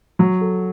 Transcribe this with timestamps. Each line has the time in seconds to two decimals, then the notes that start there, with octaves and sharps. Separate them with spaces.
0.19 F#3
0.41 A4